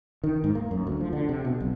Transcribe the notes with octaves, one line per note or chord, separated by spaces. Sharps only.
D#3
G#2
A#3
F#2
D2
F3
D3
C3
B2
B1